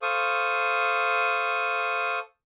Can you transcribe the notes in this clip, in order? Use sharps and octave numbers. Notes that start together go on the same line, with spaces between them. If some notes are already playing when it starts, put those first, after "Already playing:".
A4 C5 F5 C#6 D#6